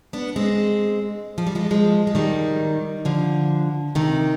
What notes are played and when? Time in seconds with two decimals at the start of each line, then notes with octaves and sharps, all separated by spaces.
0.13 B3 D4
0.36 G#3 C4
1.38 F3
1.47 G3
1.55 F3 G#3
1.71 F3 G#3
2.07 G#3
2.15 D#3 G3
3.05 D3 F3
3.95 C3 D#3